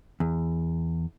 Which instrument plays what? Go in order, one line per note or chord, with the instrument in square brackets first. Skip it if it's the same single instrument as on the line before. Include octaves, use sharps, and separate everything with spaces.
[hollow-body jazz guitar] E2